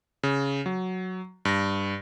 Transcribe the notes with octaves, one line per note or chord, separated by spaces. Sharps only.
C#3
F#3
G2 A#6